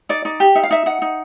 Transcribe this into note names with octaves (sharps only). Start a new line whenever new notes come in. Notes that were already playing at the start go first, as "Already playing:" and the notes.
D#4 D5
D#4 D5
G4
D#4 E5
F5
D#4 E5
D#4 F#5
D#4